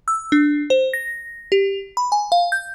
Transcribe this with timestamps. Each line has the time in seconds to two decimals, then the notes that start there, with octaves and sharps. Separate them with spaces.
0.08 E6
0.32 D4
0.70 C5
0.93 A#6
1.52 G4
1.97 B5
2.12 G#5
2.32 F5
2.52 G6